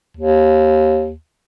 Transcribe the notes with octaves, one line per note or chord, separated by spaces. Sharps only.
D#2